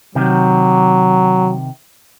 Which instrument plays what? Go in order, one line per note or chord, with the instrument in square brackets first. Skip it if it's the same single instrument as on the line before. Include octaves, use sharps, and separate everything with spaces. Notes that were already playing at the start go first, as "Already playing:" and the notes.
[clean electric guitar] C3 D#3 [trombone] F#3